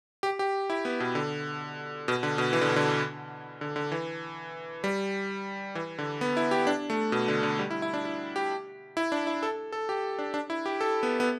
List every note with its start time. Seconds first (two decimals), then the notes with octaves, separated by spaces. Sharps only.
0.23 G4
0.39 G4
0.70 E4
0.85 B3
1.00 B2
1.15 D3
2.08 B2
2.23 D3
2.38 B2
2.53 E3
2.61 D3
2.69 B2
2.76 D3
3.61 D3
3.76 D3
3.92 E3
4.84 G3
5.75 E3
5.99 D3
6.21 B3
6.37 E4
6.51 G4
6.67 D4
6.90 A3
7.12 B2
7.28 D3
7.43 D3
7.59 G3
7.71 E4
7.82 E4
7.94 D4
8.05 E4
8.36 G4
8.97 E4
9.12 D4
9.27 E4
9.43 A4
9.72 A4
9.89 G4
10.19 D4
10.34 D4
10.50 E4
10.66 G4
10.81 A4
11.03 B3
11.20 B3